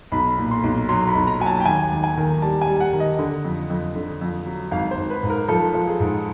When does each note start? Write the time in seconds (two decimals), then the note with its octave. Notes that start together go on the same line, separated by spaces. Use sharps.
0.12 B1 B5
0.38 A#2
0.51 C6
0.64 B1
0.89 F#3 C6
1.08 B5
1.15 B1
1.27 A#5
1.40 F#3 G#5
1.46 A5
1.60 G5
1.65 D#2 G#5
1.91 D#2
2.04 G#5
2.17 D#3
2.42 G3 A5
2.62 G#5
2.67 G3
2.80 F#5
2.93 D#3
3.00 D#5
3.19 D3
3.44 F2
3.70 F2
3.96 D3
4.21 F2
4.46 F#3
4.71 G#1 F5
4.91 C5
4.97 G#1
5.10 B4
5.23 G#2
5.30 A#4
5.48 F3 A4
5.74 F3
5.88 G#4
6.00 G#2